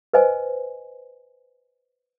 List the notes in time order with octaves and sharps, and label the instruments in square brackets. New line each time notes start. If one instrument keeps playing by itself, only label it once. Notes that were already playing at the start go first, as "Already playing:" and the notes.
[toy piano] B4 C5 D#5 G#5